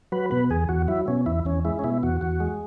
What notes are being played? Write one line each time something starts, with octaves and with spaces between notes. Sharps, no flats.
F#3 B4
B2 B4
E2 G#4
E2 F#4
F#3 E4
B2 C#4
E2 E4
E2 C#4
G#3 E4
C#4
B2 E4
E2 F#4
E2 F#4
G#3